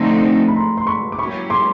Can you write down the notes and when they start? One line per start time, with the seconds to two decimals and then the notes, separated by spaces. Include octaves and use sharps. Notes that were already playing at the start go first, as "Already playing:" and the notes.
Already playing: D3 F3 A3 C4 D#4 A#5 C6
0.48 B5
0.56 A#5 C6
0.77 C6
0.87 B5 C#6
1.12 D6
1.19 F#3 A#3 C#4 E4 G4 B5 C#6
1.50 C6 D6